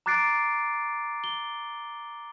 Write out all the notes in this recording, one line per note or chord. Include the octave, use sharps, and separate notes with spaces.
A#5 D6 F#6 A6 C7 D7
G7